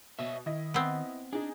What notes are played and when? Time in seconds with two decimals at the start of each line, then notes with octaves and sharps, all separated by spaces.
0.19 B2 C#5 D#5 E5
0.46 D#3 E4 D#5
0.74 B3 C4
1.33 D4 D#4 G#4